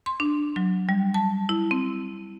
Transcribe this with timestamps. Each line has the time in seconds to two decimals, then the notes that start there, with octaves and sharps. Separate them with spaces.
0.06 C6
0.20 D4
0.56 F#3
0.89 G3
1.14 A5
1.49 E4
1.71 C4